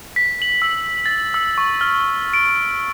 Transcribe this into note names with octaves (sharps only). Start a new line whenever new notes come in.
B6
F#7
E6
A6
E6
C#6
F6
D7